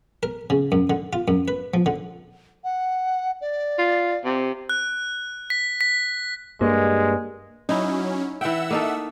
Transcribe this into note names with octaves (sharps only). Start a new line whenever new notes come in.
A#4
C#3
F#2
D3
F4
F#2
B4
F3
D3
F#5
D5
F4
C3
F#6
B6
B6
G2 G#3 A#3
F#3 C#4 D#4 E4
E3 E5 F#5 G5 E6
A#3 D#4 A4